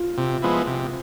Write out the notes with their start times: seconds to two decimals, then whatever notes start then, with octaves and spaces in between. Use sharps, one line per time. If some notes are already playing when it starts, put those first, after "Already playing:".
Already playing: F4
0.18 C3
0.42 F3 G#3 B3 E4
0.67 C3